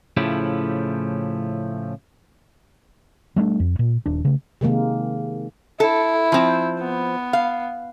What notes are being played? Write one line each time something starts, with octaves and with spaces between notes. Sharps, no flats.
A2 C#3 F3 A3 E4 G4
G3 A3 B3 D4
F2
A#2
D#1 D4
C#3 A3
C3 D#3 G#3 A#3
E4 A4
F3 C4
B3
F5